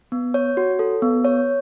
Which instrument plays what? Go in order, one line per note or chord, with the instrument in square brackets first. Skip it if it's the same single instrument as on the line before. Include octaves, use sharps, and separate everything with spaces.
[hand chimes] B3
C#5
F#4
A4
B3
C#5